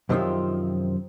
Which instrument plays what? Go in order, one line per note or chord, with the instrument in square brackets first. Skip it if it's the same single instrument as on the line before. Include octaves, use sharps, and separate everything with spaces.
[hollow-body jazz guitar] F#2 C3 D#3 F3 C4 F4